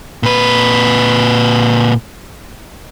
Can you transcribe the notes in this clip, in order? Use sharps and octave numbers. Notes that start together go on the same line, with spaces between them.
A#2 B4